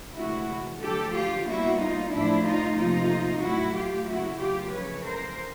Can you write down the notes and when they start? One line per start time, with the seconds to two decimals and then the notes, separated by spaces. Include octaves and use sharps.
0.16 D2 C3 E3 G#3 E4 F#4
0.81 D2 D3 F3 G4 A4
1.14 F4 G4
1.46 B2 G3 A#3 E4 F#4
1.79 D#4 F4
2.11 A2 F3 A3 D4 E4
2.44 D#4 F4
2.76 F2 C3 F3 A#3 D#4 F4
3.42 A2 F#3 A3 E4 F#4
3.74 F4 G4
4.07 E2 C#3 F#3 A#3 E4 F#4
4.39 F4 G4
4.72 F2 C#3 E3 B4 C#5
5.04 A#4 C5